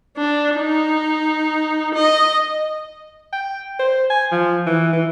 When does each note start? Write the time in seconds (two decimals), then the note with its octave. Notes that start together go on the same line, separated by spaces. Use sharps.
0.17 D4
0.57 D#4
1.95 D#5
3.33 G5
3.80 C5
4.10 G#5
4.32 F3
4.66 E3
4.92 E3